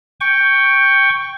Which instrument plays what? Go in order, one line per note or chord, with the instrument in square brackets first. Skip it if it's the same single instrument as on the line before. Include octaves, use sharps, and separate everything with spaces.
[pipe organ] G5 C#6